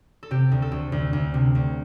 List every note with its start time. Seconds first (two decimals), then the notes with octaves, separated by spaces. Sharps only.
0.23 A4
0.31 C3 G4
0.52 D2
0.62 A4
0.72 D2
0.92 D2
1.13 D2
1.34 C3
1.55 D2